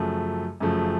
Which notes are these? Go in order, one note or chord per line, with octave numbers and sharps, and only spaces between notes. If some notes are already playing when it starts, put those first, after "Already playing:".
Already playing: F#2 C#3 F3 A3
F#2 C#3 F3 A3